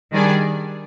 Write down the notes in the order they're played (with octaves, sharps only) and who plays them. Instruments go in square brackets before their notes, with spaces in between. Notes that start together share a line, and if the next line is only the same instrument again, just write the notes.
[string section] D#3 G3 D4 G#4 D5